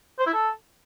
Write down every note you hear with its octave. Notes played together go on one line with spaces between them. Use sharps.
C5
E4
A4